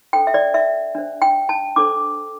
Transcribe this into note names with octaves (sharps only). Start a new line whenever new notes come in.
D4 A4 C5 G5
E5
D5
E5
D4 C5
G5
A5
D4 A4 C5 D6